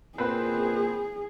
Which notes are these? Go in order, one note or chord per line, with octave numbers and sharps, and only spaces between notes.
A#2 C4 G#4 B4